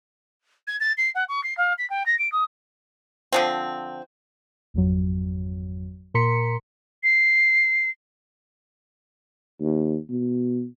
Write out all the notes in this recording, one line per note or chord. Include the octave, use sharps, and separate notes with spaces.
G#6
A6
C7
F#5
C#6
C7
F5
B6
G5
A#6
D7
D#6
D3 F3 C4
G#1 F2 F#3
A#2 A#4 A#5 C6 B6 C#7
C7
D#2
B2